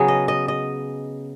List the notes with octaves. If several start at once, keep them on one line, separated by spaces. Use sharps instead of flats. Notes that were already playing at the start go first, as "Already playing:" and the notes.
Already playing: C#3 F#3 B3 G#4
D#5
D#5
D#5